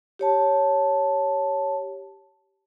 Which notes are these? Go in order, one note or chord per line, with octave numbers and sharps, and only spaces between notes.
G4 C#5 A5